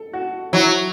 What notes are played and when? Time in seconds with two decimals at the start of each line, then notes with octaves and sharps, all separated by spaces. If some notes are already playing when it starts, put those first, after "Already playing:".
Already playing: A4
0.13 F#4
0.53 F#3 E4